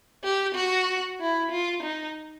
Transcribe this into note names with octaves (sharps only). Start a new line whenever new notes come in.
G4
F#4
E4
F4
D#4